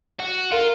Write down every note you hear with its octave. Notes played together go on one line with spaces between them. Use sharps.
F#4
F4 A#4